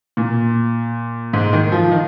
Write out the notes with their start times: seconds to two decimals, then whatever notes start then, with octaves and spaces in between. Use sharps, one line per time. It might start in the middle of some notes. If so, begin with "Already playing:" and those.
0.17 A#2
1.33 G#2
1.53 D#3
1.72 F3
1.92 D#3